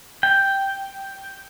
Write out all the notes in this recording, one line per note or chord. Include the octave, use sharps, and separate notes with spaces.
G5